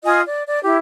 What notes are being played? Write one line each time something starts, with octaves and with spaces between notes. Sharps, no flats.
F4 D#5 G#5 D#6
D5
D5
E4 G4